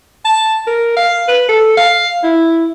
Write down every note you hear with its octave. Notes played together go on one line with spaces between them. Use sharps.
A5
A#4
F5
B4
A4
F5
E4